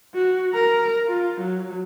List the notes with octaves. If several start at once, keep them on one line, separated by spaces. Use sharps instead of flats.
F#4
A#4 A#5
F4
F#3